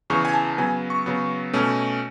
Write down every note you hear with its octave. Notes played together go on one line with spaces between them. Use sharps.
E2 C#3 E3 C#6
G#5
A5
C#3 F#3 B3 G#5
C#6
C#3 F#3 B3
B2 A3 C#4